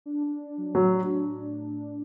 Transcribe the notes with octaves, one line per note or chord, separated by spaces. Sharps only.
D4
D4
D4
F#3
A2 F#3
D4